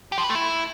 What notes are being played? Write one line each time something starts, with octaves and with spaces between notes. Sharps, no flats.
G4
F3
B4
A3
E4